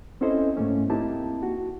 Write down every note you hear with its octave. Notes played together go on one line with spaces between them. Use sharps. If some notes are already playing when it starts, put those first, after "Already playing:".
C4 C#4 E4 A4 C5 D#5
G#2 A3 A#3 C#4
A#3 C4 D#4 E4 G4 A5
F#4